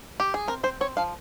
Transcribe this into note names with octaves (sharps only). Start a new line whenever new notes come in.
G4
G#4
C4 A#4
C4 C5
C4 C#5
F3 F5